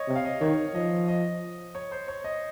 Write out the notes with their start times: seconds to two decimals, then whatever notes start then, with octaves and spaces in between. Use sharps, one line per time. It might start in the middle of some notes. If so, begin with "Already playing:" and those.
Already playing: C#5 D#5
0.08 C3
0.15 F5
0.25 D#5
0.41 D#3 C#5
0.75 F3 D#5
1.08 D#5
1.75 C#5
1.91 C5
2.08 C#5
2.24 D#5